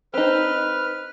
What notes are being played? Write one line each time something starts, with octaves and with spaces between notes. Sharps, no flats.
C4 D#4 B4 F6